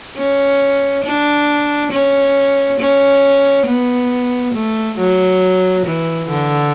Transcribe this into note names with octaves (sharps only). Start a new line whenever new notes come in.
C#4
D4
C#4
C#4
B3
A3
F#3
E3
D3